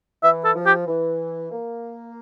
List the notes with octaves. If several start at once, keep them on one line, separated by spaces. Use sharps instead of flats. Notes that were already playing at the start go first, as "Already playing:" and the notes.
E3 E5
A4
F3
G4
E3
A#3